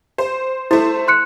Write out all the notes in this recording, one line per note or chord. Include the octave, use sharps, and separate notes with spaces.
C5
A3 E4 C5
C6 F#6 C#7